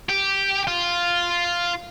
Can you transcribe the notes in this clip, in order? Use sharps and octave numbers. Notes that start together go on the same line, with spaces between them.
G4
F4